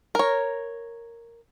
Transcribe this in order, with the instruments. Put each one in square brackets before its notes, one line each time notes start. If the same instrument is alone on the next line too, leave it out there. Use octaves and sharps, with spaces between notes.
[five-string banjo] A#4 C#5